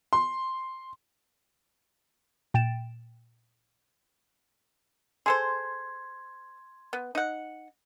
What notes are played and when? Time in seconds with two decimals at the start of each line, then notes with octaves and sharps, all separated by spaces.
0.13 C6
2.54 A#2 G5 A6 D7 E7
5.26 G#4 A4 C5 C6 G#6
6.93 B3
7.15 D#4 F#5